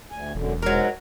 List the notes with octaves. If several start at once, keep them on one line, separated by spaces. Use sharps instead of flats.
D2 G#5
E1 F#2 D3
G#2 F#3 G#3 A#4